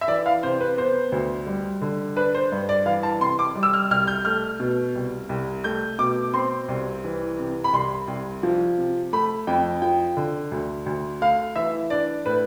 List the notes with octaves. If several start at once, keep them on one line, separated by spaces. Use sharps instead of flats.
E5
E3 D5
F5
C3 C5
B4
B3 C5
D2
G3
D3
D4 B4
C5
G2
D5
E3 F5
A5
C3 C6
D6
G3
E6
F6
C2 F6
G6
A3 F6
B2
C2
C2
A3 G6
B2 D6
C4 C6
C2
E3
C3
B5
C2 C6
C2
F3
C3
A3 B5
F2 G5
F3 G5
D3
D2
D2
A3 F5
E3 E5
D4 D5
A2 B4